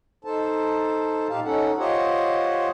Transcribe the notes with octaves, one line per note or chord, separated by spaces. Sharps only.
D#4 A4 C5 A5
A#2 D#4 G4 F5 A5
C#4 D#4 A4 F#5
F4 G4 C5 C#5 D#5 F#5